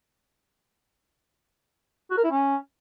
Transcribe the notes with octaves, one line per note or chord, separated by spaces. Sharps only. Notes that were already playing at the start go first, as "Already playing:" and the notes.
F#4
A#4
E4
C#4